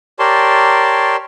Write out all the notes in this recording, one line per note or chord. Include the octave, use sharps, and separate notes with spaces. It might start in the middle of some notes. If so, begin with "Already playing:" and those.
G4 A#4 C#5 D5 A5 C6